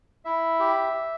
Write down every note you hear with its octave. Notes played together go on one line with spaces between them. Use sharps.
E4 E5
G4